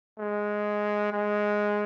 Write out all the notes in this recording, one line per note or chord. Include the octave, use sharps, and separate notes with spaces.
G#3
G#3